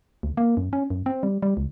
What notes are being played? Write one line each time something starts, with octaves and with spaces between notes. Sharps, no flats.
D2
A#3
F#2
C#4
F#2
C4
G3
G3
C#2